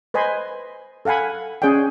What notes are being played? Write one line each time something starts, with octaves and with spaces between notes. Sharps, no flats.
B4 C5 D#5 G#5 B5 C6
A4 F5 F#5 G#5 B5
C#4 G#4 D5 F#5 G5